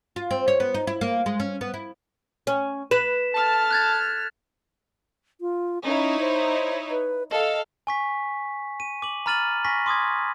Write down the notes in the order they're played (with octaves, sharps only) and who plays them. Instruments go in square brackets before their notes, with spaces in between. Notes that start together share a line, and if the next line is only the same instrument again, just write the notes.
[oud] F4
C4
C#5
B3
D#4
E4
A#3
G#3
C#4
B3
E4
C#4
[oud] B4 [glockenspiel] B6 E7
[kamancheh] A4 F6 [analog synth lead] A5
[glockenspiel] F#6 G#6 A6
[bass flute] F4
[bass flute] C#4 [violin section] D#4 E4 C#5
[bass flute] C5
B4
[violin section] A4 F5 [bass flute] D#5
[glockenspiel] G#5 C#6 B6
D#7
D6 F#7
A#5 B5 F6 A6 D#7 F#7
G#5 C#6 A#6 B6
C6 D6 D#6 G#6